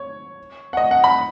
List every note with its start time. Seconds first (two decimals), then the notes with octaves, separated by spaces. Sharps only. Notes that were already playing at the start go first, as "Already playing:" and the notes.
Already playing: C#5
0.73 F#5
0.77 D#5
0.91 F#5
1.04 B5